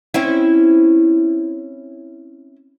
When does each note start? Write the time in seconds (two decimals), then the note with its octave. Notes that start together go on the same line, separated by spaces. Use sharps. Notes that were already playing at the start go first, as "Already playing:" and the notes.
0.14 C4 C#4 E4